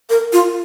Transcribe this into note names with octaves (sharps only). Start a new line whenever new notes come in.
A#4
F4